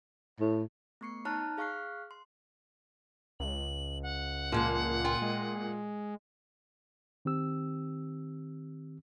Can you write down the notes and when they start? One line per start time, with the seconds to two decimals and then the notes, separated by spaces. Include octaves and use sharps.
0.40 A2
1.01 A3 B3 C#6 C7 C#7
1.25 D#4 C#5 A5 A#5 F6 F#6
1.58 G#4 F5 C#6 F6 F#6 C7
2.11 C6
3.40 C#2 F#7
4.03 F#5
4.52 A#2 F3 G#3 A#3
5.04 F4 G5 G#5
5.22 G#3
7.25 D#3 C4 G4 E6